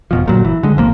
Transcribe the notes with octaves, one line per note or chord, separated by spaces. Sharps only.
F1 B2 F3
G1 A#2 F#3
E3
D3 G#3
D#1 G#1 F3 A#3